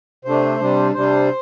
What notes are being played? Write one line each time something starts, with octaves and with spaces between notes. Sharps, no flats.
C3 A3 D4 C5
C3 G3 D4
C3 G3 D4 C5